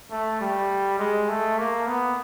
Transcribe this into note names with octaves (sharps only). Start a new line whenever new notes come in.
A3
G3
G#3
A3
A#3
B3